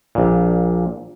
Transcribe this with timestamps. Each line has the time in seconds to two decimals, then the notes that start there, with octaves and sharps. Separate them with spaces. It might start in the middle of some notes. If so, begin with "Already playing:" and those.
0.15 A#1 A#2